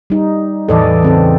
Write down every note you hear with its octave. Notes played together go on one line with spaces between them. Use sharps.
G3 D#4
E2 A2 E3 A4 D5 D#5
C#3 C4 A4